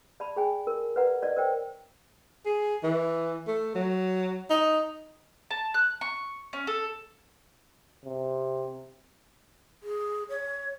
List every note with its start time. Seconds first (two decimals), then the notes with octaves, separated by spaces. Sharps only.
0.20 D5 A5 B5
0.36 G#4 G5 G#5
0.67 A#4
0.96 B4 D5 F#5 A#5
1.22 D5 D#5
1.36 A#4 C5 G5
2.46 G#4
2.83 E3
3.47 A3
3.75 F#3
4.50 D#4
5.51 A5
5.74 F#6
6.01 C#6
6.53 C#4
6.67 A4
8.05 C3
9.83 G#4
10.30 C#5